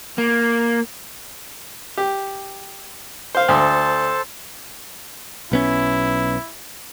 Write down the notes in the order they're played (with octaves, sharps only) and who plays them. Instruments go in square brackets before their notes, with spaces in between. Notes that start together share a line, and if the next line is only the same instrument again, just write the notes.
[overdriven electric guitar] A#3
[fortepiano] G4
C5 F5
[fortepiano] D2 [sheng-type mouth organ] A4 C5 A5
[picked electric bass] B1 B3 C#4 [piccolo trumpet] E4